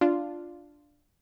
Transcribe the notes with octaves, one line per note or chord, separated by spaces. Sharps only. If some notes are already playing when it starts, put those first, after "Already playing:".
D4 F4